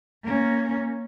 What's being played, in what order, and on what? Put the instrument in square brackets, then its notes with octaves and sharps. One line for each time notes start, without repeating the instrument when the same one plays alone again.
[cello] A#3 C#4